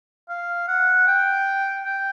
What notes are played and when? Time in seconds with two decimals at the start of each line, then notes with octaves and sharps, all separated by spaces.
0.29 F5
0.68 F#5
1.07 G5
1.85 G5